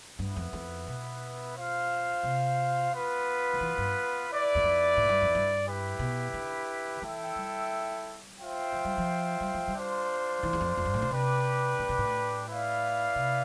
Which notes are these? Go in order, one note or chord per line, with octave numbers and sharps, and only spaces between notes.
G2 B3 E4 B4
F2
F2
B2
F4 C5 F5
C3
B3 F4 B4
D3
E3
G2
E4 B4 D5
E2
F2
A2
G2
F2
G2
E4 G4 B4
B2
D3
E3 E4 A4 E5 G5
G3
F4 C5 E5 G5
F3
G3
F3
G3
F3
G3
D4 F4 C5
E3
E2
F2
F2
G2
A2
B2
C3 D4 G4 B4
A2
B2
A2
E4 B4 D5 F5
C3